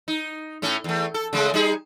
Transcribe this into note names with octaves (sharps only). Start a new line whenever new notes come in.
D#4
A2 A3 C#4
E2 A3
A4
C#3 G#3 A3
G3 D#4 G#4